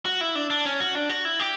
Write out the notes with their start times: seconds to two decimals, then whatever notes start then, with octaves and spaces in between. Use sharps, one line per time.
0.06 F#4
0.21 E4
0.35 D4
0.50 D4
0.65 C#4
0.80 F#4
0.95 D4
1.09 F#4
1.25 E4
1.40 G4